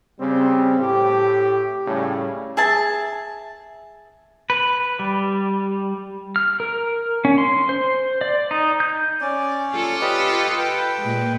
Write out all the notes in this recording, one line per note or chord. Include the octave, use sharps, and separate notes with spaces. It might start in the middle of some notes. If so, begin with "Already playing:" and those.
C#3 G3 C4
A2 G4
A2 C#3 G3 C#4
G#4 E5 A5
B4
G3
F6
A#4
C#4
C6
C5
D5
D#4
G6
C#4 D5
F4 A4
G4 B4 D#5
B4 G5
A#2 G#3